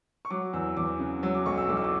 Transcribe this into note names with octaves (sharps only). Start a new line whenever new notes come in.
C#6
F#3 D6
E2 E6
E2 D6
C#3
F#3 E6
D6
B1 C#6
E6
B1 D6
E6
D6